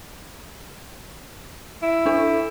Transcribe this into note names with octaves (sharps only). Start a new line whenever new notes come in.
E4
D4 A4